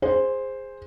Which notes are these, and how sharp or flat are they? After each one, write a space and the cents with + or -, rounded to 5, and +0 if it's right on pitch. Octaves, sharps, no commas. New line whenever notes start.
G#4 -15 C5 +0